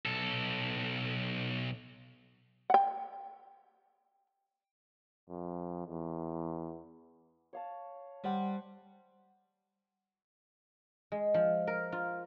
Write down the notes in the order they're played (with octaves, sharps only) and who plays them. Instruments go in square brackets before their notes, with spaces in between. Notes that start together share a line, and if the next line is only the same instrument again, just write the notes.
[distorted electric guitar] B1 A4
[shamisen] F#5 G5
[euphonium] F2
E2
[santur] C#5 F5 A5
[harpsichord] G3 [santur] C5 F#5
[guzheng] G#3
F3
A#4
F4